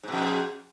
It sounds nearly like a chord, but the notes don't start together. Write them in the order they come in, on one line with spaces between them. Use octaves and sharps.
G#2 B2 F2